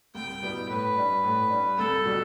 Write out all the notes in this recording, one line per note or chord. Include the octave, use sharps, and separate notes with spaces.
C2 G5
B2 G3 B3 E4
A2 B4
G3 D4
A2
G3 D4
C2 A4
B2 G3